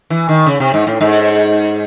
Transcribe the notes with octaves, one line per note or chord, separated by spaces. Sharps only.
E3
D#3
C#3
C3
G#2
A2
G#2